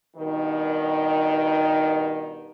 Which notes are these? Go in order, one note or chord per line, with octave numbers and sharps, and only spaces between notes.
G2 B2 D#3